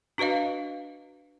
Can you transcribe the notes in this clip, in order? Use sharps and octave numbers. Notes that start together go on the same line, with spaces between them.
D4 F#4 B4 D#5 F5